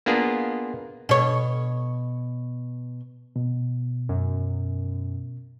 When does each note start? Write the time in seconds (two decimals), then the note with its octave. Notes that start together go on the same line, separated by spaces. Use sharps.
0.06 A#3 B3 D4 F4 G#4
1.09 B2 C#5
3.36 B2
4.09 F#2